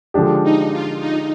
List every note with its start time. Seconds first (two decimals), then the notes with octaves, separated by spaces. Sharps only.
0.14 D3 F3 G#3 D4 G4
0.43 D#4
0.71 F4
0.99 D#4